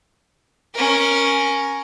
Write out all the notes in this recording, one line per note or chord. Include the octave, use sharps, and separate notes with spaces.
C#4 A#4